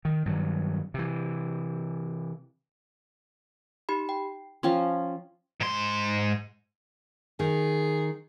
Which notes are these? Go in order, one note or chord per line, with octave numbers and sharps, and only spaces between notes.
D#3
G2 D#3 F#3
C3 E3
D#4 G4 B5
G5
F3 C#4 G5 C6
G#2 C6
D#3 G#4